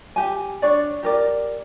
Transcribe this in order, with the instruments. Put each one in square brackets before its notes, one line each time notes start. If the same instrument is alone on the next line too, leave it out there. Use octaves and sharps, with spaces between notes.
[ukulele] G4 G#5
D4 C#5 D5
G4 A#4 D5